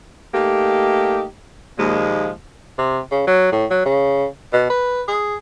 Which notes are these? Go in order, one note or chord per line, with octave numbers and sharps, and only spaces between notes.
A3 A#3 D#4 G4
D#2 A#2 F3 G#3
C3
C#3
F#3
A2
F#3
C#3
B2
B4
G#4